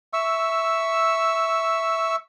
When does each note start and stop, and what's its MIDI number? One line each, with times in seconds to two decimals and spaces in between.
0.13 2.16 76
0.13 2.16 85
0.13 2.16 88